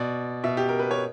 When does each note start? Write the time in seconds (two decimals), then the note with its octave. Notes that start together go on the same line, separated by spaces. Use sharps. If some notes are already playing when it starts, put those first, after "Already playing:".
Already playing: B2 D5
0.44 B2 E5
0.57 G4
0.69 A#4
0.79 B4
0.91 C#5